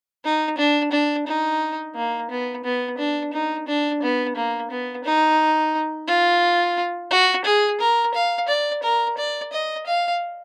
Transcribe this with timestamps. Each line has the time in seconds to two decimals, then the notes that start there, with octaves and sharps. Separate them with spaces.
0.24 D#4
0.58 D4
0.92 D4
1.27 D#4
1.95 A#3
2.31 B3
2.65 B3
2.98 D4
3.33 D#4
3.68 D4
4.03 B3
4.36 A#3
4.71 B3
5.05 D#4
6.08 F4
7.11 F#4
7.45 G#4
7.81 A#4
8.15 F5
8.48 D5
8.83 A#4
9.18 D5
9.53 D#5
9.87 F5